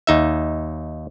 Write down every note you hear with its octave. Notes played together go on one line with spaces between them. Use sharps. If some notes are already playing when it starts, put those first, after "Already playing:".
D#2 D#4 E5